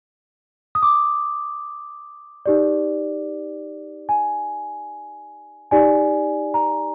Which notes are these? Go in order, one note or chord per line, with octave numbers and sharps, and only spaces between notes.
D#6
D6
D#4 G4 D5
G#5
D#4 G4 D5 G#5
A#5